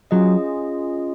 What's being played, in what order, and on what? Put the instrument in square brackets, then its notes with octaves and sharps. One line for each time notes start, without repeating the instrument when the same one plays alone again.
[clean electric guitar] F#3 [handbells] C#4 F4 G#4 D#5